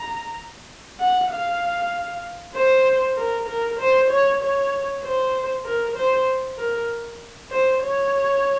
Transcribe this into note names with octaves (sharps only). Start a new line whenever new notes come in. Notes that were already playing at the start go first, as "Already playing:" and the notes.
Already playing: A#5
F#5
F5
C5
A#4
A#4
C5
C#5
C#5
C5
A#4
C5
A#4
C5
C#5